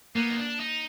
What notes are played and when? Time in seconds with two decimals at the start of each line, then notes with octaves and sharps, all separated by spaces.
0.15 A#3 B3
0.30 D#4
0.37 D4
0.60 D#4